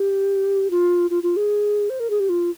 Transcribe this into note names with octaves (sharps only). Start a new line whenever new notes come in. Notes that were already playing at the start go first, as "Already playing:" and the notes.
Already playing: G4
F4
F4
F4
G#4
C5
A#4
G#4
G4
F4